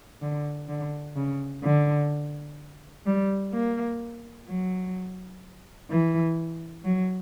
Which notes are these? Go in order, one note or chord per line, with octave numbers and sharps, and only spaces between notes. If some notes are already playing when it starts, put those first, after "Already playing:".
D3
D3
C#3
D3
G3
A#3
F#3
E3
F#3